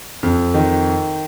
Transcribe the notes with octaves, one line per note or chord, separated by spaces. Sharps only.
F2
D#3